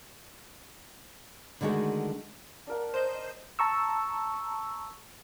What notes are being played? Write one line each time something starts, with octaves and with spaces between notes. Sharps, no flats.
D3 D#3 G#3 A3 F#4
D4 A#4 F#5
C5 D#5 G6
A5 A#5 C#6 E6